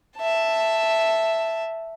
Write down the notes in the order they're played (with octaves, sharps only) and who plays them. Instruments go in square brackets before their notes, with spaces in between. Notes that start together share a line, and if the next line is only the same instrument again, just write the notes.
[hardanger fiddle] E5 A5